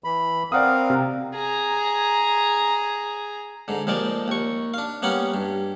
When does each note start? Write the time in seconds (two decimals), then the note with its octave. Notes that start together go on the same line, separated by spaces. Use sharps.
0.04 E3 B5
0.52 C4 A#4 D5 F5 F#5 D#6
0.90 C3
1.35 G#4 A#5
3.68 G#2 D3
3.87 D#2 F3 G#3 D5
4.28 D#2 C#6
4.74 D4 F5
5.02 G3 A#3 B3 C#4 F#5
5.34 G2